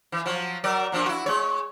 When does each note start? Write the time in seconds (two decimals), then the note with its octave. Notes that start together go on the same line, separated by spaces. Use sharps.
0.12 E3
0.26 F3 F#3
0.64 F#3 A#4 D5
0.92 A#2 F3 D4
1.06 E4 F#4
1.26 G#3 C#5